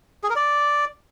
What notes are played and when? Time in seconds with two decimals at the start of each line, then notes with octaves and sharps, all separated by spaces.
0.24 G#4
0.30 A#4
0.36 D5